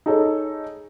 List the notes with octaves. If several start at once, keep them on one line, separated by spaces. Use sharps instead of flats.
D#4 G#4 A4 C#5